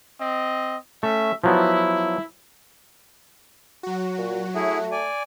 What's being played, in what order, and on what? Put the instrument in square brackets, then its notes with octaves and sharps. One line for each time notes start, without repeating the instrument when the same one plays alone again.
[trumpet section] C4 D#5
[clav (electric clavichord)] A3 [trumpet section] C#4 E5
[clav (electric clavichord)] F3 F#3 B3 [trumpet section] E4
[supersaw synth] F#3 F#4
[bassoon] A#2
[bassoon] A3 [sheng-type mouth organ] E4 G#4
[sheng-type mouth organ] D5 G#5